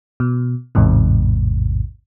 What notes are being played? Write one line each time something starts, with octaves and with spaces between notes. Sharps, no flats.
B2
A1 E2 G#2 C3